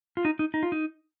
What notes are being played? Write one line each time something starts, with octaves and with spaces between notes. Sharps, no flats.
F4
D#4
D#4
D#4
F4
D#4